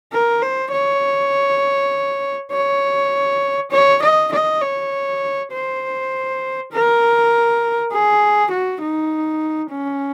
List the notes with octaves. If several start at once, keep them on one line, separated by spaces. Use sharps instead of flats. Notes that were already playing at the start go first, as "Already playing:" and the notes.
A#4
C5
C#5
C#5
C#5
D#5
D#5
C#5
C5
A#4
G#4
F#4
D#4
C#4